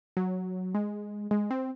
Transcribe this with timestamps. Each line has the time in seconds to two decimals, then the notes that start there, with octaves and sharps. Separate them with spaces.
0.17 F#3
0.75 G#3
1.31 G#3
1.51 C4